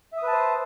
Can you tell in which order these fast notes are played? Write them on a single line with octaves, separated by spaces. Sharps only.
E5 D#6 B4 A5 C5